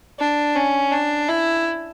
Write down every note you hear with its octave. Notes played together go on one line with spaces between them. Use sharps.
D4
C#4
D4
E4